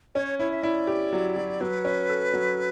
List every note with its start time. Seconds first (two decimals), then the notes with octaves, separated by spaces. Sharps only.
0.15 C#4 C#5
0.39 E4 C#5
0.51 E5
0.63 E4 D5
0.87 G4
1.13 F#3
1.36 F#3
1.61 F#3 B4
1.85 C#4
2.09 A4
2.33 F#3